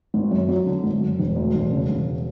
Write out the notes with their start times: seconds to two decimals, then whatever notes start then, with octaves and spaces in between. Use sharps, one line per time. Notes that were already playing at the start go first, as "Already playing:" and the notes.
0.14 G#1
0.31 F#2
0.49 F#3
0.66 D3
0.84 G#1
1.01 F#2
1.19 E1
1.36 D2
1.54 E1
1.71 C#3
1.89 E1